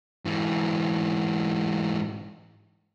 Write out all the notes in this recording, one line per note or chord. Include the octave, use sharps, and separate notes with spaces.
G#2 E3